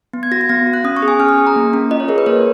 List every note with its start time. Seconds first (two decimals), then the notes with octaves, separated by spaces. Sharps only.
0.13 B3
0.23 G#6
0.31 F#4 A#6
0.41 G#6
0.49 B3 A#6
0.67 F#4
0.74 F#6
0.84 C#4 D#6
0.97 C#6
1.02 G#4
1.08 G#5
1.19 C#4 F6
1.29 D#6
1.38 G#4
1.47 A#5
1.56 A#3
1.73 C#4
1.91 F4 D#5
2.00 C#5
2.08 G#4 A#4
2.18 B4
2.26 A#3 C#5